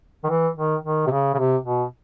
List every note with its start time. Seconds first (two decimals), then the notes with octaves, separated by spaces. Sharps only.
0.24 D#3
0.30 E3
0.57 D#3
0.84 D#3
1.07 C3
1.11 C#3
1.34 C#3
1.38 C3
1.65 B2